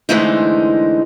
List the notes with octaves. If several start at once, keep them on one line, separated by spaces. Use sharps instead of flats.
D3 E3 G#3 A3 C4 D#4